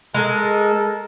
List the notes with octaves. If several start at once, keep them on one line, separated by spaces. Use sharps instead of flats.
G#3 A4 A#4